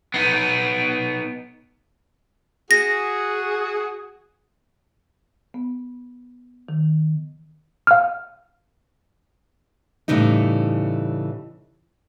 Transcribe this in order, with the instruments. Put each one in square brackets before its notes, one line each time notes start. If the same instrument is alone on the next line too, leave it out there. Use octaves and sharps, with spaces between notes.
[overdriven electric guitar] B3 D#4
[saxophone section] F#4 G#4 [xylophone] A#6
[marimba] B3
D#3
[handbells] F5 F6
[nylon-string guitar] A2 C#3 E3 G3 D#4